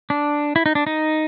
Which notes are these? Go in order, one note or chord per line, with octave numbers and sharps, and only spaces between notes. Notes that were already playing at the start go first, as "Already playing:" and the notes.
D4
E4
D#4
D4
D#4